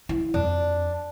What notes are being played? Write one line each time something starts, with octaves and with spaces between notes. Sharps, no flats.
E4
F2 D4